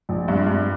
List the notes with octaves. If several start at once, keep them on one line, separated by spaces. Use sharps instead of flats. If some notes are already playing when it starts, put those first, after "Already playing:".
A#1
G2
G2